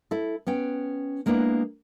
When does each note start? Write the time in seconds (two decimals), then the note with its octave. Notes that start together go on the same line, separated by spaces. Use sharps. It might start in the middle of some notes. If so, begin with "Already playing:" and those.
0.11 E4 A4
0.47 B3 C#4 G5
1.26 G#3 A#3 B3 D4 E4